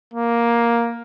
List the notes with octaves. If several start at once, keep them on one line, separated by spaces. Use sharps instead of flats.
A#3